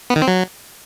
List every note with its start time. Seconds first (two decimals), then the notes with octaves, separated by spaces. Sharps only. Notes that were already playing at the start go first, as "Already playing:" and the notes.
0.10 B3
0.16 D#3
0.22 C4
0.28 F#3